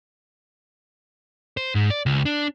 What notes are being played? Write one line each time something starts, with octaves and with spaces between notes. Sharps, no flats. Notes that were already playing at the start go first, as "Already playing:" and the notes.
C5
G#2
D5
C#2
D4